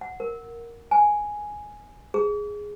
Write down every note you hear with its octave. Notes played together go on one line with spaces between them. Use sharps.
F#5
A#4
G#5
G#4